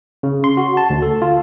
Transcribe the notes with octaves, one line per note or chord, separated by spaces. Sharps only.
C#3
C6
F#4
A5
D2
A4
F4